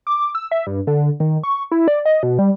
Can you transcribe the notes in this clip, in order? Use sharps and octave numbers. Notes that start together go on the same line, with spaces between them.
D6
E6
E5
G2
D3
D#3
C#6
E4
D5
D#5
B2
G3